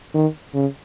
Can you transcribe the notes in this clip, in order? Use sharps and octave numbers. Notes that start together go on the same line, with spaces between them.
D#3
C#3